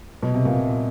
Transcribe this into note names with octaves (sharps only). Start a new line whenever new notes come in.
B2
C3
A#2